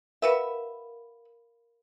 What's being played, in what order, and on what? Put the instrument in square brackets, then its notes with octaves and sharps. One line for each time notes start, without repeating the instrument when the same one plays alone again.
[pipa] F#4 B4 E5 [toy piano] A#4 F5 B5